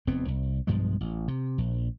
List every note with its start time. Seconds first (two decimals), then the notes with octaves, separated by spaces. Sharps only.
0.07 F1 E2 B3 C4
0.28 C2
0.67 B1 G2 F3 G#3
1.01 A1
1.28 C3
1.58 A#1